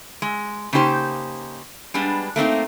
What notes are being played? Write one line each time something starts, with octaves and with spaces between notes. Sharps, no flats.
G#3
C#3 A#3 D#4 G4 C5
G3 G#3 B3 D4
A3 A#3 C4 D#4